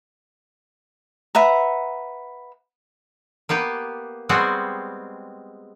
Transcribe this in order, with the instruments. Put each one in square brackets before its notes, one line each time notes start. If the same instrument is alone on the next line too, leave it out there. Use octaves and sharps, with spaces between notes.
[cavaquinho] B4 E5 F#5 A#5
[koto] A#3 B3 G4 B4
G3 G#3 B3 C4 F#4